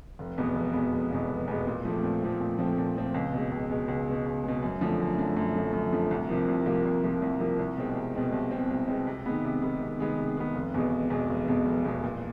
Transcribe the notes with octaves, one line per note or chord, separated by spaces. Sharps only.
F1
E2 B2 G#3 B3
F1
E2 B2 G#3 B3
F1
E2 B2 G#3 B3
F1
E2 B2 G#3 B3
A#2
F3 A3 C4
A#2
F3 A3 C4
A#2
F3 A3 C4
A#2
F3 A3 C4
C#2
B2 G#3
C#2
B2 G#3
C#2
B2 G#3
C#2
B2 G#3
F#2
D3 F3 A3
F#2
D3 F3 A3
F#2
D3 F3 A3
F#2
D3 F3 A3
C2
C3 F3 A#3
C2
C3 F3 A#3
C2
C3 F3 A#3
C2
C3 F3 A#3
C2
B2 G#3 C4
C2
B2 G#3 C4
C2
B2 G#3 C4
C2
B2 G#3 C4
C3
D#3 G#3 B3
C3
D#3 G#3 B3
C3
D#3 G#3 B3
C3
D#3 G#3 B3
F1
E2 B2 G#3
F1
E2 B2 G#3
F1
E2 B2 G#3
F1
E2 B2 G#3
A#2